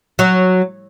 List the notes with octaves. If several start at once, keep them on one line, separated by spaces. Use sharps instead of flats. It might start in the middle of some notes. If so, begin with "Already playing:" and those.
F#3